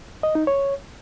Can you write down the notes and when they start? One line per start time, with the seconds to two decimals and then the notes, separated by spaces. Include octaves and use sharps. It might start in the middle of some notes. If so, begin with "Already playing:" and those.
0.23 D#5
0.35 D#4
0.47 C#5